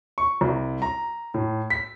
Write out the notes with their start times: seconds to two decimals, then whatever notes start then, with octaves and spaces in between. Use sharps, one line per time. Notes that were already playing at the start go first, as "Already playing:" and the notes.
0.18 C#6
0.41 C2
0.82 A#5
1.34 A2
1.70 B6